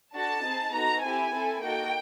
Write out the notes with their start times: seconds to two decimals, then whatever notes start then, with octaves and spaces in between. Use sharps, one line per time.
0.14 D4 F#4 A4 A5
0.44 C4 D#4 G#4
0.72 B3 D#4 F#4 A4 A#5
1.02 C4 E4 G4 G#5
1.33 C4 E4 A4
1.62 A#3 D#4 F#4 A4 G5